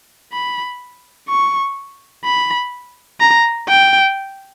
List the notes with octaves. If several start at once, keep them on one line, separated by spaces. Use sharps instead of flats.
B5
C#6
B5
A#5
G5